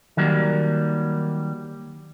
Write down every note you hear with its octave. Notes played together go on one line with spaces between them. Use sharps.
D#3 F#3 G3 A#3